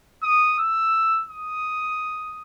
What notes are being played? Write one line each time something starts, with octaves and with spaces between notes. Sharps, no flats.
D#6
E6
D#6